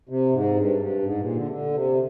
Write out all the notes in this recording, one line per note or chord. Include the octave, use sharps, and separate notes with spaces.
C3
G#2
G2
G2
G#2
A#2
D3
C3
D3
C3